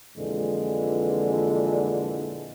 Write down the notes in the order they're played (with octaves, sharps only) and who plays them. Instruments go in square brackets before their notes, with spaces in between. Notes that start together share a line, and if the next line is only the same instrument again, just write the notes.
[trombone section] F2 A#2 D3 E3 G#3